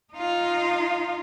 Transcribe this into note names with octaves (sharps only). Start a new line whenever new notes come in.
D#4 F4